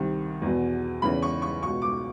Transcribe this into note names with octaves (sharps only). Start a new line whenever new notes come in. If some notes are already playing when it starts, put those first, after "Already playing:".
Already playing: C2 C3 D#3
E2 B2
E2 C#3 E3 B5
C#6
C#6
C#2 B2 C#6
D6